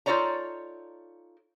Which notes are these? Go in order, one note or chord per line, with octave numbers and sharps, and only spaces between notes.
D#4 F4 A4 C#5 D5 A#5